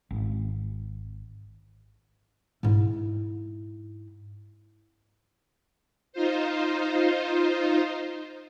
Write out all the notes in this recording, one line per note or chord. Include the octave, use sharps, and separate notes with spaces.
G#1
G#2 E4
D#4 F4 C5